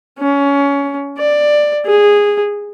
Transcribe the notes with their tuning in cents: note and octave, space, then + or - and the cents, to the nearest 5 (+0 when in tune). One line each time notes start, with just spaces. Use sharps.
C#4 +20
D5 +10
G#4 -10